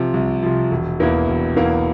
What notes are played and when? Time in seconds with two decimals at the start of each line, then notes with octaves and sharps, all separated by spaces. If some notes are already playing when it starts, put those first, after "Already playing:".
Already playing: C3 F3
0.14 C2
0.43 C3 F3
0.71 E1
1.00 E2 E3 A#3 E4
1.28 E1
1.56 E2 E3 A#3 E4